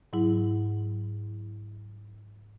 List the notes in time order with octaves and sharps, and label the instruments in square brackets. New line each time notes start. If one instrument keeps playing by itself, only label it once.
[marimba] G#2 F#3 E4